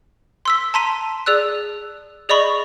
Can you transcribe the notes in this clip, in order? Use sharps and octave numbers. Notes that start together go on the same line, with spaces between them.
C6 E6 B6
A5 A#5 C6 B6 D#7
G#4 D5 E6 F#6
G#4 D5 D#5 B5 C#6 F#7